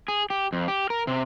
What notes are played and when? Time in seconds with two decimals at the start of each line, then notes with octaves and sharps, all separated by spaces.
0.08 G#4
0.30 G4
0.53 F2
0.68 G4
0.90 A#4
1.07 C3